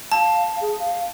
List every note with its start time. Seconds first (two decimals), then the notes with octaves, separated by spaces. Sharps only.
0.12 F5 A5
0.61 G#4
0.79 F5